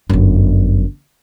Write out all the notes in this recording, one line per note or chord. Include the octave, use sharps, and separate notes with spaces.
G1 F#2